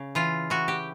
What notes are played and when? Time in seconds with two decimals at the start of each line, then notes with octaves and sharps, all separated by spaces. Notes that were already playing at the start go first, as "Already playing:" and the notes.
Already playing: C#3
0.15 E3 F4
0.50 E3 F#4
0.68 G4